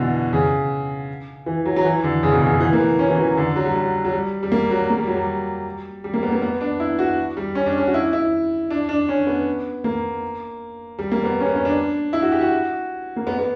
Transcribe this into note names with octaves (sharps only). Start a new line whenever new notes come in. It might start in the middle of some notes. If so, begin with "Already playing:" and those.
Already playing: B2 D3 E3
C#3
E3
F#3
F#3
E3
D3
C#3
B2
C#3
D3
E3
A#3
B3
C#4
E3
F#3
D3
F#3
G3
F#3
F#3
G3
G3
A#3
F#3
A#3
G3
F#3
G3
G3
A#3
B3
A#3
B3
D4
E4
F#4
G3
C#4
D4
C#4
F#4
E4
E4
D4
D4
C#4
B3
A#3
G3
A#3
B3
C#4
B3
C#4
D4
E4
F#4
G4
F#4
A#3
B3
B3